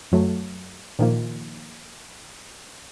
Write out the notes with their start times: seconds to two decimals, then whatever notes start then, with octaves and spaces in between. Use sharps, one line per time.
0.12 F#2 F#3 A3
0.99 A#2 D#3 F3 A#3